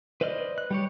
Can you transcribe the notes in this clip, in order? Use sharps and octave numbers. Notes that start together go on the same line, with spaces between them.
B4 C5 D5 D#5 F6
F#6
G3 G4 C#5